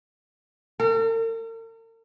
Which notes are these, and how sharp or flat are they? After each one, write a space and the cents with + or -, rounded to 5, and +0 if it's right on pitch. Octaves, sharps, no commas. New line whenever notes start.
A#4 -45